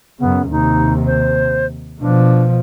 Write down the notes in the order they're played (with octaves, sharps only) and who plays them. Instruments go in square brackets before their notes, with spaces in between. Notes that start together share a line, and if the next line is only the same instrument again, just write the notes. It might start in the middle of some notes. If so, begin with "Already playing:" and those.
[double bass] F#2 C#3 [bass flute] B3
[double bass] D#2 C3 [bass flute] D#4
[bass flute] C5
[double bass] B2 F3 [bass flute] D4